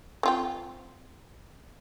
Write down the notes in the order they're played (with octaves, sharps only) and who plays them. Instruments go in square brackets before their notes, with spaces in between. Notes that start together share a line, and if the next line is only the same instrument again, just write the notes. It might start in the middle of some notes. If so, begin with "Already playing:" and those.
[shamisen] C4 F4 G5